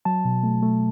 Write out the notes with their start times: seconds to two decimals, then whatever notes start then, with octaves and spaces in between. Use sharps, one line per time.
0.05 F#3 A5
0.25 B2
0.43 A3
0.63 A3